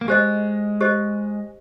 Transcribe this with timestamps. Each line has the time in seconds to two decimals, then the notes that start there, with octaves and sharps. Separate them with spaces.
0.01 A#3
0.08 G#3 G4 C5 D#5
0.81 G4 C5 D#5